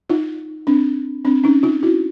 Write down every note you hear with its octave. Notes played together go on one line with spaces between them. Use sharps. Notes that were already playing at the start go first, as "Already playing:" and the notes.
D#4 F4
C4 D4
C4 D4
C#4 D#4
D#4 F4
E4 F#4